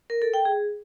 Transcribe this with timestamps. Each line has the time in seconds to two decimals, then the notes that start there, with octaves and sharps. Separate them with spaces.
0.10 A#4
0.22 A4
0.34 G5
0.45 G#4